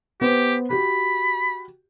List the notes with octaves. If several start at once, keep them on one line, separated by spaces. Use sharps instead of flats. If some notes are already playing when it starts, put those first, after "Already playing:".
B3 G4 B4 C5
F#4 G4 B5